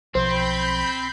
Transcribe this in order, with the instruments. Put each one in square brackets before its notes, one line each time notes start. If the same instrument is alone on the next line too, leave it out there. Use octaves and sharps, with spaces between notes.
[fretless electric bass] B1 F3 [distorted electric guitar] C4 [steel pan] C5 [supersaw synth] B5 G6